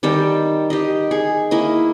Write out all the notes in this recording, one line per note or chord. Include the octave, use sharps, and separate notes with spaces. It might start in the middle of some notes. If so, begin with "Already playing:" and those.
D#3 G3 A4 G5
G4 D#5
G#4
A#3 E4 D#5